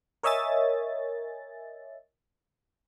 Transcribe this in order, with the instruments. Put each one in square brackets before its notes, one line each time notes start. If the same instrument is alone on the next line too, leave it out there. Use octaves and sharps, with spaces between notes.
[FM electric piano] A#4 C#5 D#5 E5 G#5 A6